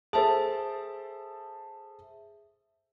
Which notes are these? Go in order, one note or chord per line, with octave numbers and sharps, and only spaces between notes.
G#4 A4 C5 E5 A5